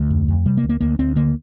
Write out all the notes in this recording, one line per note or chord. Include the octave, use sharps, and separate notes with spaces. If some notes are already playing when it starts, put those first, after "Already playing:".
Already playing: D2 A3
F2
F2
C3 G3
A#3
D2
A#3
D2 A#3
D2 C4
D3 A#3